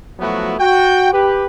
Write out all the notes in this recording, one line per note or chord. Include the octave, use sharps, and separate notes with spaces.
F3 F#3 A3 B3 E4 F#4
F#4 G5
G4 B4